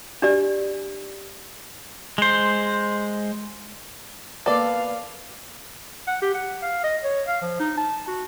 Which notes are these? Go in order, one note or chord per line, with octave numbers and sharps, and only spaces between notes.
D4 G4 D5
G#3 C5
A#3 B3 A4 B4 D5 F5
F#5
G4
F#5
F5
D#5
C#5
F5
F3
D#4
A5
F#4